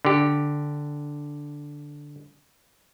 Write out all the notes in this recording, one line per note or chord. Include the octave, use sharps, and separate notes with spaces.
D3 G4